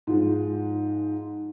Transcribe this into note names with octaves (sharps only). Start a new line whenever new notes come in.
G#2 F3 G#3